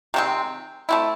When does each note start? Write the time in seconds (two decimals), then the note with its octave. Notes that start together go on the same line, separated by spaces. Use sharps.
0.14 C3 D#3 G#3 C4
0.89 A3 C4 E4